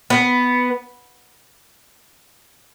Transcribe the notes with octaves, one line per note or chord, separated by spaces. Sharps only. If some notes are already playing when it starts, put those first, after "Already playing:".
B3